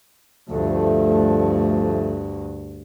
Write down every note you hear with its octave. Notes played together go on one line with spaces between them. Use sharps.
D2 G2 F3 A3